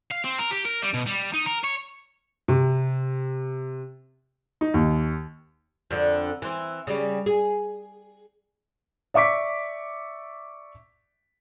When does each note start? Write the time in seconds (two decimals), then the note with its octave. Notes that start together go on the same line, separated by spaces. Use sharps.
0.11 F5
0.24 C4
0.39 A#4
0.51 G4
0.65 A#4
0.82 G3
0.94 B2
1.07 G3
1.34 D#4
1.46 A#4
1.64 C#5
2.48 C3
4.61 D#4
4.74 D#2
5.91 F2 D3
6.42 E3 C4
6.87 C#3 G3
7.26 G#4
9.14 D5 E5 C#6 D6 B6